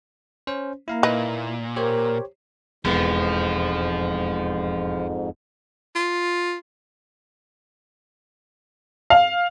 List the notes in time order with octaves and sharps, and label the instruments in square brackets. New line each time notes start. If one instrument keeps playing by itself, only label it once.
[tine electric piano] C#4 C5
[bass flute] A#3 [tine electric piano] E4 F5 A#5
[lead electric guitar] A#2 [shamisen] D#4 B4
[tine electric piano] G4 C5 C#5 [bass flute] A#4
[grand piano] E1 B3 [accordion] F2 G#2 [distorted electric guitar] F3
[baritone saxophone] F4
[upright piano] F5